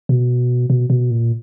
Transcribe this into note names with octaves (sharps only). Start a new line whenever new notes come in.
B2
B2
B2
A#2